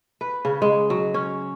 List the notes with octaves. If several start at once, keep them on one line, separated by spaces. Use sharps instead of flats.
B4
C#3
G#3
F#3
C#4